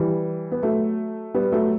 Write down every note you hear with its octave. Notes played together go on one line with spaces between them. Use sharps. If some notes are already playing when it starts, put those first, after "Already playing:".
Already playing: E3 G3
B3
F#3 A3
G3 B3
F#3 A3